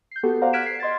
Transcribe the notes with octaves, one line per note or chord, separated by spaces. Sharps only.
G6 C7
B3 F#4 G4 A4
C5 D5 F5 F#5 A#5
F6 F#6 G#6 B6 D7 E7
C7
D#5 C6 G#6 A6